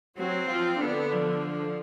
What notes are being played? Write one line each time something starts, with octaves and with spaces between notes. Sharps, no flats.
F#3 C4 F#4
F3 F4
D3 B3 D4
F3